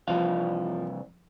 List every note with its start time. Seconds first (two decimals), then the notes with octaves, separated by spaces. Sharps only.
0.08 C2 E3 F3 F5